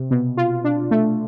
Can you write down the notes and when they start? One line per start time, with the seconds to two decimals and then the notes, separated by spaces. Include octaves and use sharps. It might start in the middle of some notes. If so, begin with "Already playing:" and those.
Already playing: C3
0.11 B2
0.37 F4
0.64 D4
0.91 A3